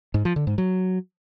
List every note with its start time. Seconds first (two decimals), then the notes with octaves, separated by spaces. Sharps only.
0.14 G#2
0.25 F3
0.36 D3
0.47 G#2
0.58 F#3